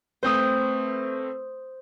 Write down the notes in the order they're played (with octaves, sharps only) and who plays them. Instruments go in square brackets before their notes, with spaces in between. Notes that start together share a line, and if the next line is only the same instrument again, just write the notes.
[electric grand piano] A3 C4 B4 [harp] C5 D#6